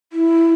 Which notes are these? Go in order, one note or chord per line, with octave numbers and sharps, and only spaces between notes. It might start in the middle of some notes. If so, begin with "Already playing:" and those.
E4